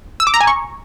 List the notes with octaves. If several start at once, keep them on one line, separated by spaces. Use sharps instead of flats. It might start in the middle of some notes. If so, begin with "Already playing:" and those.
E6
D6
A#5
G#5
C#6